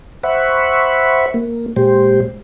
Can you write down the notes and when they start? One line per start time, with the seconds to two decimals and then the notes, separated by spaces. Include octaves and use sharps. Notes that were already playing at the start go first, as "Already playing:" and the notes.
0.23 C5 E5 F#5 B5 C#6
1.34 A#3
1.76 A#2 G#3 G4 C5